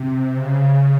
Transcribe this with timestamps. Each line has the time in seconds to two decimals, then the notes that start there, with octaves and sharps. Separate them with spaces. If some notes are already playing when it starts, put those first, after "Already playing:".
Already playing: C3
0.33 C#3